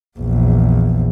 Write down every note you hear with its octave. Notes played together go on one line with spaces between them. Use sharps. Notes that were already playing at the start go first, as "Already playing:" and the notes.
A#1 E2